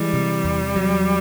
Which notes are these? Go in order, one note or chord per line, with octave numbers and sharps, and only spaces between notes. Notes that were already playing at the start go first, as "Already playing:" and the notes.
Already playing: E3 G3 G#3
C3
E2
F#3